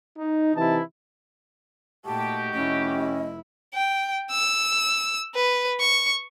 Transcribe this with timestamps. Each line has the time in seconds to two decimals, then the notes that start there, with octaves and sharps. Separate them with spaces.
0.18 D#4
0.55 C3 E3 D#4 E4 A5
2.05 A#2 A3 D#4 F#4 G4 A5
2.54 F1 C#4 E4 D#5
3.74 G5
4.31 E6
5.34 B4
5.80 C#6